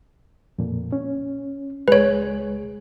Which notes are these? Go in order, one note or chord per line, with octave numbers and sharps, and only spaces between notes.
F2 A#2 A#3
C#4
C#2 G#3 G#4 B4 C#5